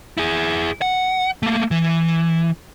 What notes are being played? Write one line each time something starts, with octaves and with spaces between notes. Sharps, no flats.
E4 G#4
F#5
A3 A#3
E3